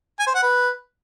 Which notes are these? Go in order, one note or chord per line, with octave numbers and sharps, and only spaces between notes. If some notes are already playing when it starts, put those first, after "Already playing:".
G#5
C5
F#5
B4